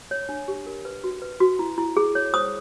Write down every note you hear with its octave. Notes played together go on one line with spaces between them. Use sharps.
C#5
D4
G4
A#4
B4
F#4
B4
F#4
E4
E4
G#4
C#5
C5 D#6